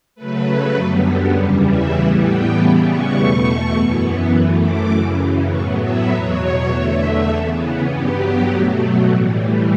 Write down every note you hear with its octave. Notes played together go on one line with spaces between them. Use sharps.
C#3 F#3 A3 B4
F#2 D3 G3 B3 A4
E2 C#3 E3 G3 C#5
E5
A2 E3 G3 B3 F#5
G5
C#3 E3 G3 B3 A5
C#6
E2 B2 A3 C#6
F#2 E3 B3
F#2 E3 A3
D6
F#2 C#3 E3
A2 F#3 B3 C#6
E5
E2 B2 F#3 C#5
E2 D3 A3 E5
C#3 E3 B3
G2 F#3 B3 G4
B2 F#3 A3
A2 E3 G3